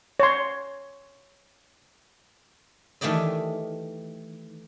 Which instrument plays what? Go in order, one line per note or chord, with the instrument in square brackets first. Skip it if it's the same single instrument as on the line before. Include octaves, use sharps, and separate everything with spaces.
[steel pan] C#5 C6
[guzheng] D#3 E3 A3 G4 D5 D#5